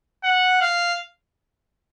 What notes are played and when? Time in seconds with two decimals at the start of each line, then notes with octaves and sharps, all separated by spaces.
0.24 F#5
0.62 F5